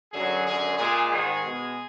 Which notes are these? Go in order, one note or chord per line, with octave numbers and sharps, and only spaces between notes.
F#2 D3 F#3 G#4
F#2 D3 G#3 G#4
A#2 G#3 G#4
G#2 D#3 G#3 G#4
B2 G#3